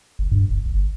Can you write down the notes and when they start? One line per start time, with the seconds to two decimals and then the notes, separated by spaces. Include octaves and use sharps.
0.19 F#1
0.32 G2
0.50 F#1
0.66 G1